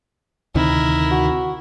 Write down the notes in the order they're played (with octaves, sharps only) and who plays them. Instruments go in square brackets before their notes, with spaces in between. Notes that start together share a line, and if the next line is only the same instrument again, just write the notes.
[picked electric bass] D2 C3 D#3 [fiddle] E4 A#4
[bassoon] F#4